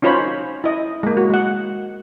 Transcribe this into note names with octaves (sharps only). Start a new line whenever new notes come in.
C#4 D#4 F4 C5 C#5 B5
E4 D#5
G#3 A#3
F#4
G#3 F#5